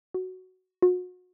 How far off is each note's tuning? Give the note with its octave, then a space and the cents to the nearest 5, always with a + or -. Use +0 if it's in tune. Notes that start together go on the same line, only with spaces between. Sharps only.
F#4 +5
F#4 -35